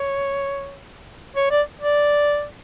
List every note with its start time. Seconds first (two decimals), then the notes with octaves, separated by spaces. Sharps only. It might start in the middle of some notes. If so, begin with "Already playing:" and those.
Already playing: C#5
1.36 C#5
1.51 D5
1.81 D5